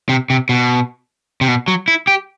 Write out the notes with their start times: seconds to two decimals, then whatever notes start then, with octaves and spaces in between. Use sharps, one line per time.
0.09 C3
0.30 C3
0.49 B2
1.41 C3
1.48 B2
1.68 F#3
1.88 E4
2.07 G4